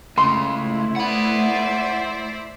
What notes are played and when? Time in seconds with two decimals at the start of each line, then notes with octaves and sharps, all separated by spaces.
0.18 C#2 C#3 A3 E4 C6
0.96 C5 D5 E5 F#5 B5